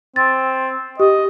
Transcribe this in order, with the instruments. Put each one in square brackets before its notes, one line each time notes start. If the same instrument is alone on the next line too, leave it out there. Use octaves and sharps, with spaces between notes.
[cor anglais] C4 [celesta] A6
[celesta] G4 [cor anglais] D#5